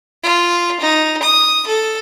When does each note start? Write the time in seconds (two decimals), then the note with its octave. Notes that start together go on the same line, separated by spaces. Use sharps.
0.23 F4
0.80 D#4
1.23 D#6
1.67 A4